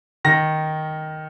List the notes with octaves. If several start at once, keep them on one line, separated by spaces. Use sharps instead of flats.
D#3 A#6